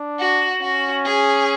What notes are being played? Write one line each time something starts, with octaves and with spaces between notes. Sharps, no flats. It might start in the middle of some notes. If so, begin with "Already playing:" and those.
Already playing: D4
F#4
C#4 F#4
G#4